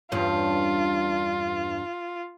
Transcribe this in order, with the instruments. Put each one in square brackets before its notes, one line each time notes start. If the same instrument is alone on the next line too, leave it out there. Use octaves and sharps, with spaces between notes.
[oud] E2 G2 C#4 [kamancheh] F4